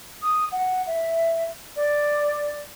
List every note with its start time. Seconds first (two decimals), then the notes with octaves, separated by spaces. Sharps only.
0.22 D#6
0.52 F#5
0.87 E5
1.76 D5